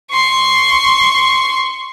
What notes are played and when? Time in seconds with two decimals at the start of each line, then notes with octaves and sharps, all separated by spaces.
0.11 C6 C#6